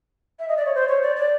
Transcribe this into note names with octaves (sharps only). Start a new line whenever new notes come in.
E5
D#5
D5
C#5
C5
C#5
D5
D5